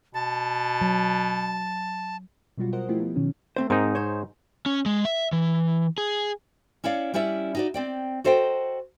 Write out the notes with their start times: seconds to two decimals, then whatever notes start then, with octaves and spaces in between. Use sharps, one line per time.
0.14 B2 A5
0.81 F#3
2.57 B2 F#3 G3 F4 F#4
2.73 A#4 C5 D#5 F#5
2.89 F3 A3 E4 F4 G4
3.00 F3 B3
3.16 B2 D#3 F#3 C#4
3.56 A3 C4 C5
3.70 G#2 C4 D#4 A#4
3.95 C5 C#5
4.66 C#4
4.86 G#3
5.05 E5
5.33 E3
5.98 G#4
6.84 C#4 E4 C#5 D5 F5
7.14 G3 C#4 E4 D5 E5
7.55 D#4 F#4 D5
7.74 C4 D5 G5
8.24 F#4 A4 C5 D#5 F5 G5